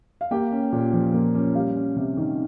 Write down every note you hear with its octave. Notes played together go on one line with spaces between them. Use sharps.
F5
A#3 G4 G5
C#4
A#2
F3
A#3
C#4
G3 F5
C#4
C3
D#3